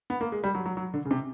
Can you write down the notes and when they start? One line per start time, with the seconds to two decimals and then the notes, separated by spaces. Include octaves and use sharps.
0.10 B3
0.21 A#3
0.32 G#3
0.44 G3
0.55 F#3
0.66 F#3
0.77 F#3
0.94 D3
1.05 C#3
1.11 C3